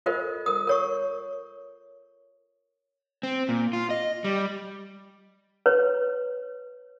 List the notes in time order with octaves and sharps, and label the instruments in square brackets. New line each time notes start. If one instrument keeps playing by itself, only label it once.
[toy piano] F4 A4 A#4 C5 D#5
A#4 D#6
A#4 C#5 C#6
[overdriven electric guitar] C4
A#2
F4
D#5
G3
[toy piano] B4 C#5